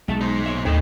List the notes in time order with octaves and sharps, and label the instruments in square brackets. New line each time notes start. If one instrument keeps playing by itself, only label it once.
[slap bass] B1 [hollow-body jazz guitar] G#3 E5 A5
[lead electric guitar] D#4 C5
[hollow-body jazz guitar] A#2 C#5 E5
[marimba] D#2 [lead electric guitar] A2 [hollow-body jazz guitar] C4 A4 D#5